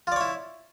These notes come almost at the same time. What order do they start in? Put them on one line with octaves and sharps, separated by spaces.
F4 D5 C#5 E4